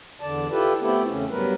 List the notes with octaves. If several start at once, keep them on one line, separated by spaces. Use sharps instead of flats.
E2 D3 D5 A5
E4 F4 G4 A4 B4
A3 B3 C4 E4 G4 A4
E2 C#3 A3 C#4
G2 F#3 G3 B3 A#4 B4